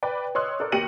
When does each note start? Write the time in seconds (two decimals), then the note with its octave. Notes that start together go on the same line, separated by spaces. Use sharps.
0.03 B4 D5 G5
0.35 C#5 D#5 C6 D#6 E6 F#6
0.60 A4 A#4 D5
0.72 D#2 G4 A#6 C#7 D#7 F#7